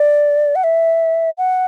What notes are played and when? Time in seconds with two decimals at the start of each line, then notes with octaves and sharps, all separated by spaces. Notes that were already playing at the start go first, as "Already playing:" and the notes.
Already playing: D5
0.56 F#5
0.64 E5
1.38 F#5